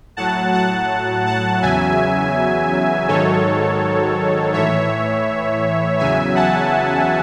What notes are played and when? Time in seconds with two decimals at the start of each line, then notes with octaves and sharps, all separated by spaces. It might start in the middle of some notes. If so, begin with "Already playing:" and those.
0.17 A2 F#3 F#5 A5
0.53 F#5 A5
1.26 F#5 A5
1.62 E2 C#3 F#3 E5 G#5
3.08 G#2 D#3 F#3 A4 C#5
4.53 A2 E3 C#5 E5
5.99 E2 C#3 F#3 E5 G#5
6.35 F#5 A5